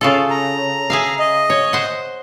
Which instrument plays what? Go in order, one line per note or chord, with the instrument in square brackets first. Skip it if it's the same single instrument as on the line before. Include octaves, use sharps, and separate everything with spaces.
[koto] C#3 F4 A4
[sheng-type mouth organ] A#5
[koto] G#4 E5 F5
[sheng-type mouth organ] D#5
[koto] C#5
C5 F#5